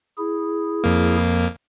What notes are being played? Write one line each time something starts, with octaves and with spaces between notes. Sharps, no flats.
E4 G#4
F2 A#3